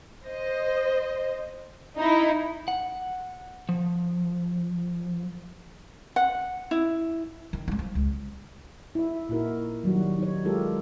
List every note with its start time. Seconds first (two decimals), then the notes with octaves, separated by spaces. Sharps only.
0.24 C5 D#5
1.97 D#4 E4
2.68 F#5
3.69 F3
6.16 F#5
6.71 E4
7.53 D#3
7.68 G3 C4
7.79 F3
7.95 C#2
8.95 E4 E5
9.29 A#2 D#4 E4 F#4 A#4
9.84 D#3 F#3 G3 F#4
10.19 D#4 C#5
10.45 G#3 F4 G4 A4 A#4